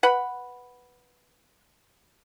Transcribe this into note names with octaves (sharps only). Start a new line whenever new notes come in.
B4 F#5 B5